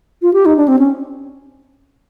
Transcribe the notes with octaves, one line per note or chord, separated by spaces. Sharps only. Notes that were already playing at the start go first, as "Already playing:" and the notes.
F4
G4
D#4
D4
C4
C#4